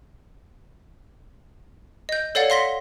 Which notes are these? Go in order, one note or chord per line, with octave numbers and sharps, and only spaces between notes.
D#5 G6
A4 C#5 D5 F5 F#5 A6
F5 F#5 C6 A#6 B6 G7